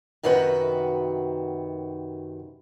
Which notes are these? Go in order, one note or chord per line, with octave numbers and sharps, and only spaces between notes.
F#2 C3 D#3 F#4 B4